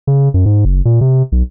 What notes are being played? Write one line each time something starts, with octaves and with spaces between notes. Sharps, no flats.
C#3
F#2
G#2
F#1
A#2
C3
B1